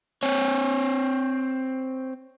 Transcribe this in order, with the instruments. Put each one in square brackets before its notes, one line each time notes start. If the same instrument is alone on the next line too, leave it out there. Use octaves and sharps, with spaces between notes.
[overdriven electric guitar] C4 C#5